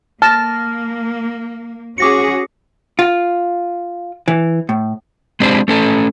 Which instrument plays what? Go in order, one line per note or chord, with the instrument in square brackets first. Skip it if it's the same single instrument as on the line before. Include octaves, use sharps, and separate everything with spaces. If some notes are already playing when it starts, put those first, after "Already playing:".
[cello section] A#3 [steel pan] A5 [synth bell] F6 A#6
[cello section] C#4 F#4 G#4 [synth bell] D6 A#6 C#7
[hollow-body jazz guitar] F4
E3
A2
[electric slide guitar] G#3 C4 D4 G4 C5
A3 C#4 A4